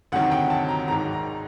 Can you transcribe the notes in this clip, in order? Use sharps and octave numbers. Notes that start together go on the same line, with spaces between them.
D2 C3 D#3 F#3 F#5
G5
A5
A#5
G#1 G#2 D#3 A#5
A#5